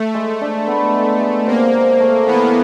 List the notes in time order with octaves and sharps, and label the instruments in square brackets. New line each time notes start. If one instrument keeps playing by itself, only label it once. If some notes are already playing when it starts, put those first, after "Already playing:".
Already playing: [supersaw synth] A3
[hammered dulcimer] G#3
D4
B3
G#3
G#3
[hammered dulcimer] C3 [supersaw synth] A#3
[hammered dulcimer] C3
A3
[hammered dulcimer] E3 [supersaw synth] B3